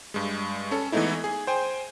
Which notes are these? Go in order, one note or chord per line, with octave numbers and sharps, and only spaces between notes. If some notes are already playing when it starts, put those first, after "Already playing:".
G2 G#3
C#4 A4
E3 G#3 A3 B3 D#4 E4
G#4
C5 G5 G#5